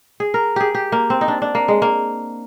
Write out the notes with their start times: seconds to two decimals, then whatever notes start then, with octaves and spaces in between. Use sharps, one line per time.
0.20 G#4
0.34 A#4
0.56 G4 G#4
0.75 G4
0.92 A#3
1.10 C4
1.21 D#4
1.28 D4
1.42 D4
1.55 A#3
1.68 G#3
1.82 A#3